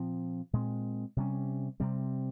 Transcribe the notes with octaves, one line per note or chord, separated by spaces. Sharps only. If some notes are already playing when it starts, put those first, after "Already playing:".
Already playing: A#2 F3 C4
A#2 G#3 C4
C3 G3 C#4
C3 G3 C4